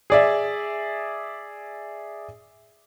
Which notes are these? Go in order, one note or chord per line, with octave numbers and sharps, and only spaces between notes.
G#4 D5 E5